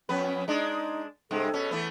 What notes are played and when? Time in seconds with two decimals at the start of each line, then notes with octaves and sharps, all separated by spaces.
0.09 F2 B3 C#4 B4
0.48 G#3 D4 D#4
1.31 G2 C3 G#3 A4
1.53 B2 C#4
1.71 E3 A3 B3